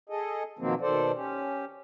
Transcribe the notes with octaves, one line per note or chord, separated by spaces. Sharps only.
G#4 A4 D#5
B2 D#3 F3 F#3 A#3 C4
B2 D#3 A4 C5 D5
C#4 G4